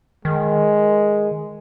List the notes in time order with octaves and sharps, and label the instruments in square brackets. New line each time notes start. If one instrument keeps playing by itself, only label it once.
[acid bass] D#3 [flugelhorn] G#3